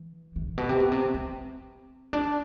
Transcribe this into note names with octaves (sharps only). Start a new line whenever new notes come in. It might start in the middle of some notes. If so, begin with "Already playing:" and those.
Already playing: E3
E3
A2
B2
C3
B2
C3
C4
D4